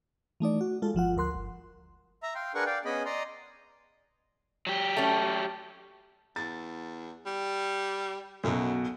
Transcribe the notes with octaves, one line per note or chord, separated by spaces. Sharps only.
E3 A3 D#4 D5
F#4
G#3 F4 A4
G1 F3 F4 F#5
D2 A#4 C6 F#6
G1
E5 A#5
F5 G5 C6
D4 G#4 A#4 B4 F#5 C#6
D5 F5 G5
B3 C#4 G#4 D#5 B5
D5 D#5 A#5 C6
F#3 G4
A3 C#4
E2 A6
G3
B1 F#2 B2